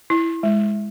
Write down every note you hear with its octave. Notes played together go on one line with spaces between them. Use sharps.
E4
G#3